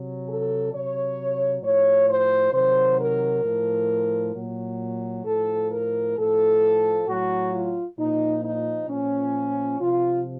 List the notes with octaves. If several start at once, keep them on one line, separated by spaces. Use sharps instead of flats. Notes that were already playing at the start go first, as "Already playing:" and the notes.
Already playing: C3 F#3
A4
C3 F#3 C#5
A2 F3 C#5
C5
C3 D#3 F#3 C5
A#4
A2 F3
A#2 F#3
A2 F3 A4
A#4
A2 F3 A4
A2 F#3 F#4
F4
A#2 F3 D#4
D#4
A#2 F3 C#4
C3 F3 F4